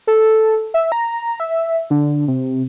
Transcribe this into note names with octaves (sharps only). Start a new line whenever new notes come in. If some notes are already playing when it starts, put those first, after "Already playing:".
A4
E5
A#5
E5
D3
C3